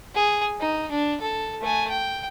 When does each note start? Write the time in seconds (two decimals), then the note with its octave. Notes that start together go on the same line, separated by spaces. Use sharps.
0.15 G#4
0.60 D#4
0.91 D4
1.21 A4
1.62 A3 G#5
1.90 G5